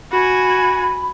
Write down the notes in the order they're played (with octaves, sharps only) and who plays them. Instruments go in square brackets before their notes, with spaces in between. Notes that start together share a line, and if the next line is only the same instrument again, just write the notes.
[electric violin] F#4 G#5 [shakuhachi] B5